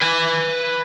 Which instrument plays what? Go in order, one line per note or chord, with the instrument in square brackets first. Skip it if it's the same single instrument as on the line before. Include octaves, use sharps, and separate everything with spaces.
[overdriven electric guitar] B4 G#5